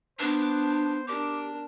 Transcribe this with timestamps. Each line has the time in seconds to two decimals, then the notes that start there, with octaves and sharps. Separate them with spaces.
0.19 B3 D4 C5 D6
1.08 D4 G4 A#4 D6